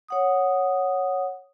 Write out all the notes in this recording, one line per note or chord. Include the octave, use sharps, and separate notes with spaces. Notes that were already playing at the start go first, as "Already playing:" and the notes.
C#5 F#5 D#6